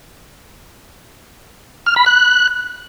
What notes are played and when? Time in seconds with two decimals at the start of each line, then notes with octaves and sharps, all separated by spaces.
1.86 F6
1.96 B5
2.06 F#6